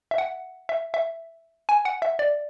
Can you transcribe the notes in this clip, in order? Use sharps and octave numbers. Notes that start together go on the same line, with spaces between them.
E5
F#5
E5
E5
G#5
F#5
E5
D5